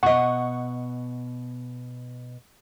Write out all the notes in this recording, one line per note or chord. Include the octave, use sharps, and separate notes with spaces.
B2 D#5 F#5 C#6